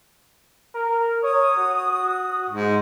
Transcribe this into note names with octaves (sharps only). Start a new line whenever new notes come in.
A#4
C#5 D#6
F#4
G#2